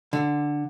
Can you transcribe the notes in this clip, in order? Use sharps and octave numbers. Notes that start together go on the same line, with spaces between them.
D3